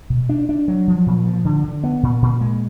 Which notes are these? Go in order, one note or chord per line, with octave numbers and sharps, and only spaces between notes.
B2
D4
D4
F#3
F3
A#2
F3
D3
D3
B3
A#2
A#2
G#3